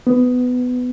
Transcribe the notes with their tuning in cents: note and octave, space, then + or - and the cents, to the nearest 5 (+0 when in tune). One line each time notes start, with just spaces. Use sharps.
B3 +15